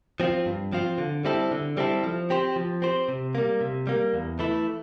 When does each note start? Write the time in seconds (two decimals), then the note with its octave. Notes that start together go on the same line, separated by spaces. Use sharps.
0.20 F3 C4 F4
0.46 G2
0.72 F3 C4 F4
0.98 D3
1.25 G3 C4 E4 A4
1.52 D3
1.77 G3 C4 E4 A4
2.04 F3
2.30 C4 G4 C5
2.56 F3
2.82 C4 G4 C5
3.08 C3
3.35 G3 A#3
3.61 C3
3.87 G3 A#3
4.14 E2
4.39 E3 A3 E4